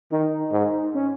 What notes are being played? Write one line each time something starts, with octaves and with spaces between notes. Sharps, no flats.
D#3 D#4
G#2
C#4